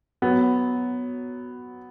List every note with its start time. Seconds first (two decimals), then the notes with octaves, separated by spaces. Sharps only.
0.22 F#3 B3